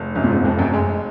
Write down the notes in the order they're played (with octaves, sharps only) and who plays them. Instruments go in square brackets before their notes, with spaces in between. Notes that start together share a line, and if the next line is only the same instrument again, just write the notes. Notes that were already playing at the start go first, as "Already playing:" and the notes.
Already playing: [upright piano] F1
[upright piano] F1 [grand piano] F#2
[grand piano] A#2
G#2
[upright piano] F1 [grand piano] F2
[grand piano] F#2
[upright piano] G#3